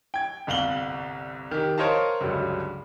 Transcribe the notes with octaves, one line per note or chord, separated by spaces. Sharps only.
G5 G#6
G1 C2 F5 F#7 G7
D#3 G4
A#4 C5 C#5 D#5 F5 A5
C#2 G2 D3 F#3